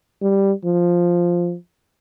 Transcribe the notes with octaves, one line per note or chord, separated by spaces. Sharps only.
G3
F3